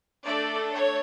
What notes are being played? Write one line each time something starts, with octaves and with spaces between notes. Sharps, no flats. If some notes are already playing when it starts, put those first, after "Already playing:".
A3 D4 A4 D5
C#5